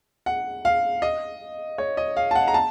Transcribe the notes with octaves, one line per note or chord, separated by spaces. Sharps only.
F#5
F5
D#5
C#5
D#5
F5
A5
F#5
A#5
A5